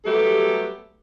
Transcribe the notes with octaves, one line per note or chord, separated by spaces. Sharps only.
F#3 G3 A3 B3 G4 A4